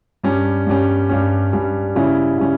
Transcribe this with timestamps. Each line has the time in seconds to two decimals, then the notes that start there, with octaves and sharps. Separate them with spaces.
0.24 G2 G3 C#4
0.67 G2 G3 C#4
1.09 G2 G3 C#4
1.53 G2 G3 C#4
1.95 C#3 G3 C#4 E4
2.38 C#3 G3 C#4